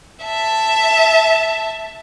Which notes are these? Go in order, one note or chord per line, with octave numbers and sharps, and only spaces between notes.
E5 A5